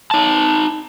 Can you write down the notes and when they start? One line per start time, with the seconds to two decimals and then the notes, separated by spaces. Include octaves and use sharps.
0.11 D#4 A5